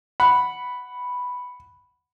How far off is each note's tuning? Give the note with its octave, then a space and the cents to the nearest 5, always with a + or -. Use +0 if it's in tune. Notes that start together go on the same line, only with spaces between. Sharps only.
F#5 +0 B5 +0